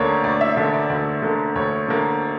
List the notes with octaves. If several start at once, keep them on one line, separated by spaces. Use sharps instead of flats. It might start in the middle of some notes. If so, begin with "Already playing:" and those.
Already playing: D2 D3 A#3 C#5 D5
D2 D5
E5
D3 A#3 E5
D5
D2 D5
D3 A#3
D2 C#5
D3 A#3